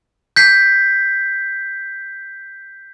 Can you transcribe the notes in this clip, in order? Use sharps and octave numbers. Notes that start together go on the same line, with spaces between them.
G6 B6 C7